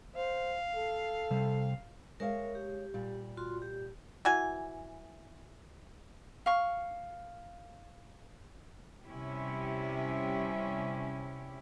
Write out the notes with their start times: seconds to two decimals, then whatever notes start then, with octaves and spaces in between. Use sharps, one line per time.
0.17 C5 F5
0.76 A4
1.31 C3 G3
2.20 G#3 A#4 C#5 E5 F5
2.55 G4
2.94 A#2 G3
3.37 F4 F#4 C6
3.62 G4
4.25 E3 F#4 G#5
6.46 F5 C#6
9.05 C3 G3 C#4 E4 G4